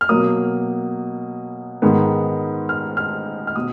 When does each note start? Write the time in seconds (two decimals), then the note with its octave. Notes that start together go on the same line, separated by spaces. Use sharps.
0.01 F6
0.09 B2 F#3 A#3 D#6
1.82 G#2 D#3 G#3 B3
2.69 F6
2.97 F6
3.47 F6
3.56 B2 D#6